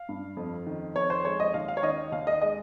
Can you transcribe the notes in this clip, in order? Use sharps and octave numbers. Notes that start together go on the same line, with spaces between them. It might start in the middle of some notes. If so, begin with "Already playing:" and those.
Already playing: F5
G2
F2
D#3
F2 C#5
C5
G#3 C#5
D#5
D#2 F5
F5
C#5
D#3 D#5
D#2 F5
D#5
G#3 D#5